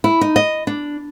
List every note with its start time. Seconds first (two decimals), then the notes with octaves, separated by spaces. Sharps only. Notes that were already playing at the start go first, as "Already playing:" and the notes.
0.04 E4
0.21 D#4
0.36 D#5
0.67 D4